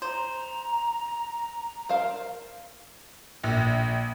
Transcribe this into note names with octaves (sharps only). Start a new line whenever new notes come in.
C5 A#5
A#4 C5 F5
A#1